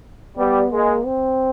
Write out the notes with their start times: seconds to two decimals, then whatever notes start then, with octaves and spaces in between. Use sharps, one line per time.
0.38 G3 B3
0.72 G#3 A#3
1.06 C4